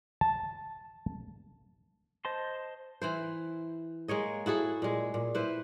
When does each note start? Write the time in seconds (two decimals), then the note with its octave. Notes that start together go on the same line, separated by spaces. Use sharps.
0.21 A5
2.25 C5 D#5 A5 C6
3.02 E3 E4 C5
4.08 G#3 A#3 C#5 D#5
4.46 E4 F#4 G#4 A4
4.82 A#2 G#3
5.14 A#2
5.35 E4 B4 C5